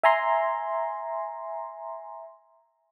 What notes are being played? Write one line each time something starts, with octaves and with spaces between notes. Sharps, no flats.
E5 G#5 A#5 C6